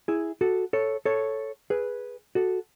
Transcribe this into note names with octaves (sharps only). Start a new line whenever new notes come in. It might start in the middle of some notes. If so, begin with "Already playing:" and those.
E4 G#4
F#4 A4
A4 C#5
A4 C#5
G#4 B4
F#4 A4